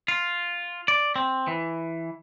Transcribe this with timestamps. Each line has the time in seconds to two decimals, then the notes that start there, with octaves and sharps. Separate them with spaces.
0.08 F4
0.88 D5
1.16 C4
1.48 E3